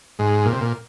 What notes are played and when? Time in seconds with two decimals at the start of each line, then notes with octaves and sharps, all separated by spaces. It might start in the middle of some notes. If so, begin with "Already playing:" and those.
0.19 G#2
0.45 A#2
0.53 C3
0.61 A#2